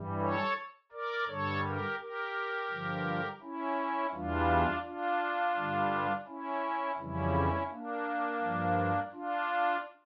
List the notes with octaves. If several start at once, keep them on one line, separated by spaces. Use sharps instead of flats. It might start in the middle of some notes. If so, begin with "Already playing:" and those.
Already playing: G2 E3 G3
A4 C#5
A#4 D5
G2 D3 G3 A4 C#5
G4 A#4
G4 A#4
G2 D3 F3
C#4 E4
E2 E3 G3 D4 F4
D4 F4
G2 D3 G3
C#4 E4
F2 C#3 E3 G3 C#4 E4
A#3 D4
G2 F3
D4 F4